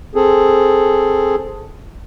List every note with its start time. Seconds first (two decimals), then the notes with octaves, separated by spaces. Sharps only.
0.15 C4 G#4 A4